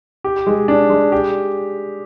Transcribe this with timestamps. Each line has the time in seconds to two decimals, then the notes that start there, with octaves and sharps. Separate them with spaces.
0.24 G4
0.47 G#3
0.68 D4
0.90 G#3
1.12 G4